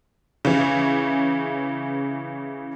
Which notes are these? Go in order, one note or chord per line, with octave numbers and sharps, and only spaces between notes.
C#3 E3